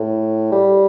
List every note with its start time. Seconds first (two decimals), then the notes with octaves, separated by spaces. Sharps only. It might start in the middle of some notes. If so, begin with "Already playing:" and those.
Already playing: A2
0.52 G3